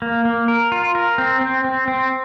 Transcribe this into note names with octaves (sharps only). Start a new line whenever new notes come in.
A#3
A#3
A#4
F4
A#4
C4
C4
C4
C4